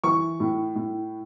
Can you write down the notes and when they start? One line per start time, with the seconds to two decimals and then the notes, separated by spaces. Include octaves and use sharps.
0.04 E3 C#6
0.40 A2
0.76 A2